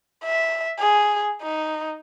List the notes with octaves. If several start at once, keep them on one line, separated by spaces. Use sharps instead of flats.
E5
G#4
D#4